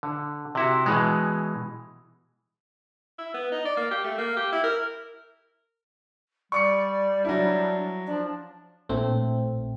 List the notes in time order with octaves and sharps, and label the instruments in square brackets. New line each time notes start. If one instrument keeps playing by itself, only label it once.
[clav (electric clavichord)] D3
C3 E4 F#4
B2 E3 G#3
[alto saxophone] E4
B3
D#4
D5
A#3
G4
A3
A#3
G4
E4
A#4
[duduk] G3 [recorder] D5 [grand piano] C#6 D6 C#7
[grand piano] F#3 E4 [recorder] D4
[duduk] F3 [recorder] D4
[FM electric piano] A#1 A2 A3 C4